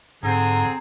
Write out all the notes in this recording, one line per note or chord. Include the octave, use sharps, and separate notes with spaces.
G#2 D3 C4 G#4 A#5